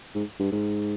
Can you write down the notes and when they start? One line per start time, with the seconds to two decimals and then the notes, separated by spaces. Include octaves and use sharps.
0.15 G#2
0.40 G2
0.52 G#2